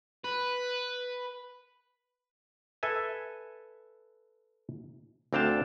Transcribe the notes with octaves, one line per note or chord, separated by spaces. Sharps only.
B4
A4 B4 E5 G#5
D2 C4 D4 F5 G5 A5